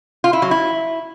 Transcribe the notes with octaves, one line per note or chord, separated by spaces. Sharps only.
F4
E4
F#3
E4